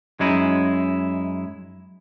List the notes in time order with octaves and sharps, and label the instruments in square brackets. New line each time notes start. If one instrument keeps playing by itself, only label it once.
[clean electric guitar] F#2 G#3 D#4 E4